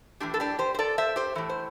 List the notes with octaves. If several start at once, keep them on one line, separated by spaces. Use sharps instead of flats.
A2 E3 D4 G4
A4
D4 G4
G4 C5
C5
A4 D5
C5 E5
G4 C5
A2 E3 A4
C5